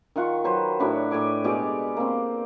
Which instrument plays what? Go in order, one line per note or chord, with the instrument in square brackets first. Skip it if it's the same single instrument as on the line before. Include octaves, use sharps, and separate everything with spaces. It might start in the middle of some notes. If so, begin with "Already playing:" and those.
[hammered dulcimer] D#3 F4 F#5 C#6
F#3 B4 C5
A2 D4 F#4 B5
A2 G5 G#5 D6
B2 G#3 G4 D5
A#3 C4